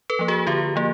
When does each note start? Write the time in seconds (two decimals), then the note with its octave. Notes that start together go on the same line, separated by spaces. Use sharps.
0.10 A4 B4
0.19 F3 A#3
0.28 F#4 G#4
0.47 D3 F4 G4
0.76 F3 A#3